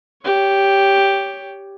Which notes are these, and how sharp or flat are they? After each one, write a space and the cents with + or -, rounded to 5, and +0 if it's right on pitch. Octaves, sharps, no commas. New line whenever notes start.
G4 +0 C#5 +20